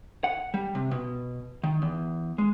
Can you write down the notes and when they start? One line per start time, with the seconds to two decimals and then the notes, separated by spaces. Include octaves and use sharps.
0.24 F#5
0.54 G3
0.75 C3
0.91 B2
1.63 D#3
1.82 E2
2.38 G#3